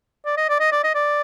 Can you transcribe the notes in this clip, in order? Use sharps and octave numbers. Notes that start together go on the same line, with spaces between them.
D5
D#5
D5
D#5
D5
D#5
D5